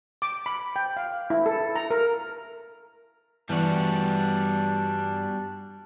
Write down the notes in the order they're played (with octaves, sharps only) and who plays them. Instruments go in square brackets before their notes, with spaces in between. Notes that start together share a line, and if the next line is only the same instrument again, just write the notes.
[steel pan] D6
B5
G5
F5
E4
A4
A#5
A#4
[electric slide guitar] G2 B3 D5 [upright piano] E3 [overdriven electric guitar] G3 F#4 [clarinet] D4